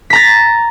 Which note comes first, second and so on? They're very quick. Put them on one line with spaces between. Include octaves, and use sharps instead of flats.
B6 A#5 A6